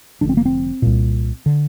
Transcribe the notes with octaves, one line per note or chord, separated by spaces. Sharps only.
F1 F2 D3 D4
C4
A#3
C4
C2 A#2
D3